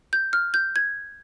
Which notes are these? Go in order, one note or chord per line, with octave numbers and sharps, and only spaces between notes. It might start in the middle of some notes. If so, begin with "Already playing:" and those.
G6
F6
G6
G#6